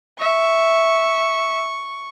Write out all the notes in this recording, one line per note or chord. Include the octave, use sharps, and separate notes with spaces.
E5 C#6